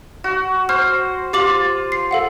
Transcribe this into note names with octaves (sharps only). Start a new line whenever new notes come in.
F#4
C5 F6
F4 G4 D6 F#7
C7
A4 F5 F#5